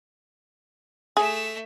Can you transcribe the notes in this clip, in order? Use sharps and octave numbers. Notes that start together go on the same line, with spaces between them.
A3 G#4 E5